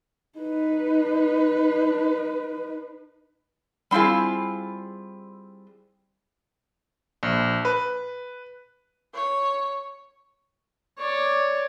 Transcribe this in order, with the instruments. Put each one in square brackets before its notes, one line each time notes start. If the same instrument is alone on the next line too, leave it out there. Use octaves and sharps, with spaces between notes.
[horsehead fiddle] D#4 B4
[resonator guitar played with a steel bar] G3 C4 E4 F4 G#4
[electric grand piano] A#1
B4
[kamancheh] C#5
[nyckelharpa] C#5 D5